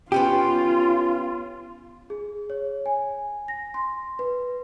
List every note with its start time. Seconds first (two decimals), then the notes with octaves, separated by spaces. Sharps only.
0.12 B3 C#4 F4 G4
2.10 G#4
2.50 C#5
2.86 G#5
3.48 A#6
3.74 C6
4.19 B4